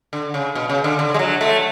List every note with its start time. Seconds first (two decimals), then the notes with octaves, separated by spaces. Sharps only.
0.13 D3
0.34 C#3
0.55 B2
0.70 C#3
0.84 D3
0.99 D3
1.14 G#3
1.19 F#3
1.41 A3